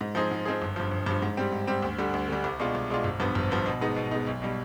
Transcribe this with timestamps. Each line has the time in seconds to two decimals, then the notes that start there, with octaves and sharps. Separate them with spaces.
0.01 G#2
0.15 F3 C4 D#4 G#4
0.31 G#2
0.45 F3 C4 D#4 G#4
0.62 G1
0.76 G2 F3
0.91 G1
1.06 G2 F3
1.22 G#2
1.37 G3 C4 G4
1.52 G#2
1.67 G3 C4 G4
1.82 D2
1.98 D3 G3
2.14 D2
2.29 D3 G3
2.44 C2
2.59 B2 G#3 D4 F4
2.75 C2
2.90 B2 G#3 D4 F4
3.04 G#1
3.20 G2 F3 B3
3.35 G#1
3.51 G2 F3 B3
3.66 B2
3.81 G#3 B3 D#4
3.96 B2
4.11 G#3 B3 D#4
4.27 B1
4.42 B2 G3